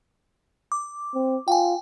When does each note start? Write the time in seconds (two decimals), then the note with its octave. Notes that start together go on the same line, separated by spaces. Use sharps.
0.72 D6
1.15 C4
1.48 F4 G5 G#5